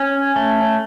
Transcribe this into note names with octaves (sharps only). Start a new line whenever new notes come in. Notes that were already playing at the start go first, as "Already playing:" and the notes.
Already playing: C#4
A3